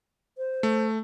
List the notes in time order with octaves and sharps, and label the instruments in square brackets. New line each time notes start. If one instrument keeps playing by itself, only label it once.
[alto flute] C5
[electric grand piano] A3